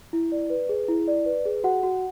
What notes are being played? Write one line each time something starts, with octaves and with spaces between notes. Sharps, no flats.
E4
D5
B4
G#4
E4
D5
B4
G#4
F#4 F#5
F#4